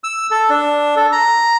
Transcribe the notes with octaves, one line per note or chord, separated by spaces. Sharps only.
E6
A4
D4
A4
A#5